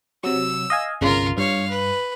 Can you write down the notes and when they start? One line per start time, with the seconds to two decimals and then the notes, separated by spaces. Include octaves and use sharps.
0.24 C3 F#3 E6
0.70 D#5 F5 G#5
1.01 G1 C2 C#3 F4 A#4
1.38 G2 C#5 F5
1.70 B4